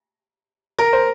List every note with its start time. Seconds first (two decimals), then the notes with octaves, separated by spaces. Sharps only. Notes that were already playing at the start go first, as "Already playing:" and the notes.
0.79 A#4
0.93 C5